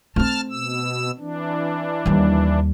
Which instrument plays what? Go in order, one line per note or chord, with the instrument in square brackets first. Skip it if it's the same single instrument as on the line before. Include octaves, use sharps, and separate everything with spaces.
[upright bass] A3 C4 [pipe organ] A5 F6
[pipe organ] B2 E6
E3 D4
[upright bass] D#2 G3